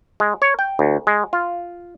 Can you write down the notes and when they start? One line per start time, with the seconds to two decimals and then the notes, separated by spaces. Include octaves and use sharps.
0.20 G#3
0.42 C#5
0.59 G5
0.79 D2
1.07 G#3
1.33 F4